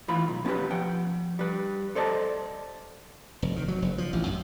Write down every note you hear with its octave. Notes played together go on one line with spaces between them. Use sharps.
D#2 A2 E3 F4 B5
B1
B3 C#4 D#4 F#4 G4 B4
F3 F#5 G5
G3 B4
A4 C5 D5 D#5 A5
F1
D#3
F#3
F#1
F3
A1
F#2